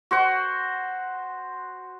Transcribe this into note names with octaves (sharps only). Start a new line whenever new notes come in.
F#4 C5 F#5